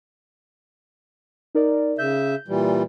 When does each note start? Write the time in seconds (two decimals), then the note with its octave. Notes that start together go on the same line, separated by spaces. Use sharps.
1.55 D#4 A#4 D5
1.98 C#3 E5 G6
2.48 A#2 E3 G3